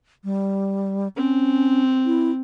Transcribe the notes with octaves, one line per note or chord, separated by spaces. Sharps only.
G3
C4 C#4
E4